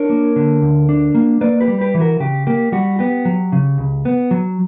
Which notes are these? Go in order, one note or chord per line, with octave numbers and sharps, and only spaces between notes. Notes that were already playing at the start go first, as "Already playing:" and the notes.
Already playing: D4 A#4 C#5
A#3
D3
D2
D4
A#3
A#3 B4 D5
G4 B4
G3
G4 B4
E3
F#4 A#4
C#3 G4
A#3 G4
G3 F#4
B3 G4
F#3
C#3
C#2
B3
F#3